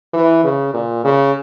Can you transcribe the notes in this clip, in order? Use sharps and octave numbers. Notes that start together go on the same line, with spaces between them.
E3
C#3
A#2
C#3